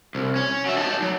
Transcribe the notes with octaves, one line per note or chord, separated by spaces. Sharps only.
C2
C#4
F#3 E5
D#4 A5
F#3